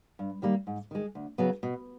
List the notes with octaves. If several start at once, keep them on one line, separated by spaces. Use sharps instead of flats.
G2
D#3 G3 A#3
G#2
D#3 G#3
D2
C#3 F#3 B3
B2